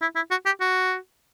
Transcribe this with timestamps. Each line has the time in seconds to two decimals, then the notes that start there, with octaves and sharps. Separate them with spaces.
0.01 E4
0.15 E4
0.31 F#4
0.46 G4
0.60 F#4